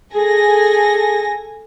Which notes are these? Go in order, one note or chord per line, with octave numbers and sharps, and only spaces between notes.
G#4 A4 G#5 A#6